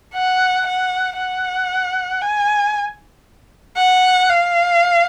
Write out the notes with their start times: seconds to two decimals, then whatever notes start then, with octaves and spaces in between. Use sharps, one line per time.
0.14 F#5
0.66 F#5
1.18 F#5
2.21 G#5
3.77 F#5
4.29 F5